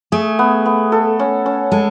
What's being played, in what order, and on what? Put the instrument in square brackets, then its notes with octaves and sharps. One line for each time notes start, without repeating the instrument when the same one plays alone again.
[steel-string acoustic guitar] A3 [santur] G#4
[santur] B3
B3
A4
C#4
C#4
[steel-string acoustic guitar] G#3 [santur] A4